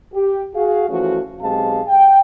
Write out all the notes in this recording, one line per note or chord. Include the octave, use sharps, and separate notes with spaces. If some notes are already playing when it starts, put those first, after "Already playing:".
G4
F#4 G#4 F5
E3 F3 A3 C#4 F#4
B1 G#3 C4 G4 F5 A5
G5